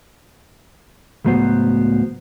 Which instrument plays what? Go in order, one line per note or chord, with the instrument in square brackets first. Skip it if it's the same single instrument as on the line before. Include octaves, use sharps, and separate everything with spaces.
[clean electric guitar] C#2 A2 F#3 B3 C5